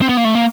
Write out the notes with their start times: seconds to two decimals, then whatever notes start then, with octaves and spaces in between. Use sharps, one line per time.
0.02 C4
0.09 B3
0.17 A#3
0.25 A3
0.35 A#3